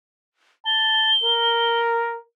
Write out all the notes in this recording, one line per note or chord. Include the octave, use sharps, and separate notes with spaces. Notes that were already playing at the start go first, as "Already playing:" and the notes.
A5 G7
A#4